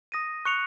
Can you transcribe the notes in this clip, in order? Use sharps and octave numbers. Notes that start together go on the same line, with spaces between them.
D#6 A#6 D#7
C#6 F#6 C#7 F7